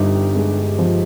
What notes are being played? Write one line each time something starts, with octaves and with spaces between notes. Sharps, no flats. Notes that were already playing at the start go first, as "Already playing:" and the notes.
Already playing: G1 G2 D#4 G4
G#3
F3